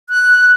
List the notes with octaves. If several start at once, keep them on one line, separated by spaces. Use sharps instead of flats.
F#6